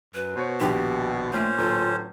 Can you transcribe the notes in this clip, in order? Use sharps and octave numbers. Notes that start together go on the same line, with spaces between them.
F#2 B4
B2 C5 C#5
A#1 D#2 D#3 G4
A#2 A3 C#4 C5
D1 F4 A4